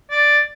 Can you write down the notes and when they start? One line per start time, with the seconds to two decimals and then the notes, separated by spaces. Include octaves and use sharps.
0.11 D5